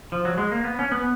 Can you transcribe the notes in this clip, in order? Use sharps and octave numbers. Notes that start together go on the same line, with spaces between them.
F3
F#3
G#3
A#3
B3
C#4
B3